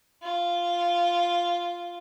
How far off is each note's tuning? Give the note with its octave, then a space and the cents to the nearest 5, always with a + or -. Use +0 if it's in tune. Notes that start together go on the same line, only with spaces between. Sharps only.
F4 -5